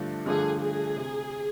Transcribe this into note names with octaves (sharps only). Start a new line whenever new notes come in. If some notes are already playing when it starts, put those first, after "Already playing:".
Already playing: G2 D3 F3 A3 D4
G2 D3 F3 A3 D4 G#4
G#4
C3